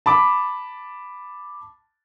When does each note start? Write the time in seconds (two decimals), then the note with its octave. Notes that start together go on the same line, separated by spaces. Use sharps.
0.06 A5 B5 D6